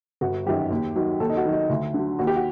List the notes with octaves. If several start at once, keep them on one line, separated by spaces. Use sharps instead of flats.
G1 F#4
F#2 D#3 F#3 G4
D#2
D#3 F#3
D#2 A4
D#4
F#4
D#3 F#3
D#4
D2
D3 F#3
D#2 F#4
G4
F#4